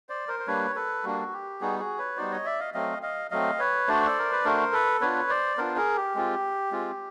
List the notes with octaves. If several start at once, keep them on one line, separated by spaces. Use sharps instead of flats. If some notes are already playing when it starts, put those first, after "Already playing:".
C5 D5
A#4 C5
C5
G3 A#3 D4 B4 C#5
A4 B4
G3 A#3 D4 F#4
G4
G3 B3 D#4 F#4 G#4
F#4 G#4
B4 C#5
G3 B3 D#4 F#4 C5 D5
C#5 D#5
D5 E5
D#5 F5
F#3 A3 C4 D#5 F5
D#5 F5
F#3 A3 C4 D#5 F5
B4 C#5
A3 D4 F#4 C5 D5
A4
A#4
B4
A3 D4 F#4 A#4 C5
A4 B4
B3 D4 F4 B4 C#5
C5 D5
B3 D4 F4 A#4 C5
G#4 A#4
G4
G#3 C4 F4
G#3 C4 F4